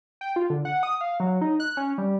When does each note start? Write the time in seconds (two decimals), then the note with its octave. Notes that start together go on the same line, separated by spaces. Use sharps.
0.21 G5
0.36 F4
0.50 D3
0.65 F#5
0.83 D#6
1.01 F5
1.20 F#3
1.41 D#4
1.60 F#6
1.77 C#4
1.98 G3